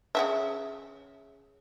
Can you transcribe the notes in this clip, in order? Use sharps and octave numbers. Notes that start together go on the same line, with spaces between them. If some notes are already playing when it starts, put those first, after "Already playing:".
C#3 E3 E5